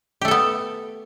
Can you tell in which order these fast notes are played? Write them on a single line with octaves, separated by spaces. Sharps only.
G4 A3 A4 B3